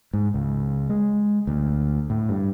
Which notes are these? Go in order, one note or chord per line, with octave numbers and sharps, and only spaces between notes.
G#2
C#2
G#3
D2
A2
G2